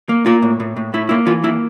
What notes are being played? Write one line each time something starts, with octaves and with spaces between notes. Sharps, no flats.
A#3
A#3 F4
A2
A2
A2
A2 E4
A#3 E4
E3 F4
A#3 E4